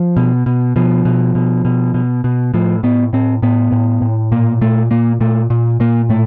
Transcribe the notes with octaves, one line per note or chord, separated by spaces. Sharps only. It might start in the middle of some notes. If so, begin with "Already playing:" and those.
Already playing: F3
B2
B2
B2 F3
B2
B2
B2
B2
B2
A2 F3
A2 B3
A2 C4
A2 B3
A2
A2
A#2 A#3
A#2 A3
A#2 A#3
A#2 A3
A#2
A#2 A#3
A2 A3